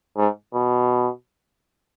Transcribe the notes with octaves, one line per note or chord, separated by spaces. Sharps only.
G#2
B2